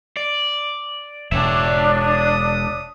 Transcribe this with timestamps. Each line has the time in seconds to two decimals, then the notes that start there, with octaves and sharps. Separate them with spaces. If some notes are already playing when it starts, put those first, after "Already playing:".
0.17 D5
1.32 E1 D4 C#5 E5
1.81 D#6